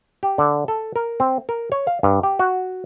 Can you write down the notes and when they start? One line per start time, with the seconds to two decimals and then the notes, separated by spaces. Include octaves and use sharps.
0.23 G4
0.38 D3
0.68 A4
0.96 A#4
1.20 C4
1.49 A#4
1.72 C#5
1.87 F5
2.03 G2
2.23 G4
2.39 F#4